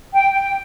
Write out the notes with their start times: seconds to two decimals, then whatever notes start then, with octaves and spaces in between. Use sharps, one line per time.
0.12 G5
0.31 G5